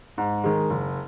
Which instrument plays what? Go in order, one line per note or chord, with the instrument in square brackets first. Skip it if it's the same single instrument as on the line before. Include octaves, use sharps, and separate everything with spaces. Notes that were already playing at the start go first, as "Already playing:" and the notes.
[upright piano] G#2
D#3 G#3
F#1